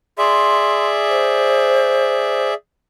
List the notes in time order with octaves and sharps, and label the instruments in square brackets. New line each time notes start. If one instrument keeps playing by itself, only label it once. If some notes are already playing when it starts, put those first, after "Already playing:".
[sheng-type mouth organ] G#4 D5 E5 [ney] C6
[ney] C5